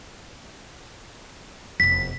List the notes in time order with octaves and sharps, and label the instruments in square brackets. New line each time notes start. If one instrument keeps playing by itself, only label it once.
[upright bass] F1 E2 [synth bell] B6